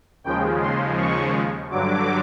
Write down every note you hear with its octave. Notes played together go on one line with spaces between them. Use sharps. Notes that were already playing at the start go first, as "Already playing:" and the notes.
D#2 C#3 F3 G#3 G5
C6
C#6
G2 D3 F#3 D6